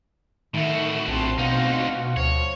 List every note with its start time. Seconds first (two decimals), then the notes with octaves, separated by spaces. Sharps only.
0.54 A2 D3 D#3 A3 F#4 E5
1.08 A#1 C4 A5 C6
1.38 D2 B2 D#4 F4 F#4
2.17 D2 F3 C#5